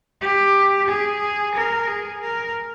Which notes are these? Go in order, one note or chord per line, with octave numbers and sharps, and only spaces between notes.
G4
G#4
A#4
G#4
A#4